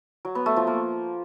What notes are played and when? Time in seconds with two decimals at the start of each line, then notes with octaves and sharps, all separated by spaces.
0.25 F#3
0.35 B3
0.46 A3
0.56 F3
0.67 A#3